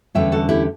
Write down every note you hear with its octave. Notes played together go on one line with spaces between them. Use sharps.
E2 D3 G3 C#4 E5 G5
F#4 A4
E4 G4